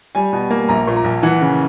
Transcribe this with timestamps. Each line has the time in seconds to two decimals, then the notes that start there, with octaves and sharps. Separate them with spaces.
0.15 G3 G#5
0.33 B2
0.50 A#3
0.68 A#1 A#5
0.87 A#2
0.96 A#5
1.04 A#1
1.23 E3 F#5
1.41 C#3